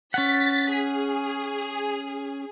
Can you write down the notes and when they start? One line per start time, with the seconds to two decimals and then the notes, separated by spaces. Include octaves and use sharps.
0.14 C#4 F#5 A6 B6
0.71 G#4